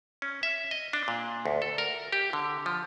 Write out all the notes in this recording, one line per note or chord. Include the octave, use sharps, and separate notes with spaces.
C#4
E5
D#5
D4
A#2
D2
A4
A#4
G4
D3
F3